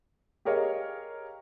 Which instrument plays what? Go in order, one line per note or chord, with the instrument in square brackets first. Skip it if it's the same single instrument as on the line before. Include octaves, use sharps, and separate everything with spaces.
[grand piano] G4 G#4 A#4 C#5 D#5 F5